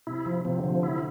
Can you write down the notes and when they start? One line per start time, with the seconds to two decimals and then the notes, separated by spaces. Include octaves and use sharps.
0.07 C3 E4
0.26 F3
0.45 C3 F3
0.58 D3
0.64 F3
0.71 C3
0.83 D3 E4